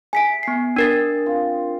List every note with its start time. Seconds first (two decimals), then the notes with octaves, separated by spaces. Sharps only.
0.13 G#4 E5 G#5 B6 D7
0.43 B3 C7
0.76 D4 A#4 A6
1.26 C4 F4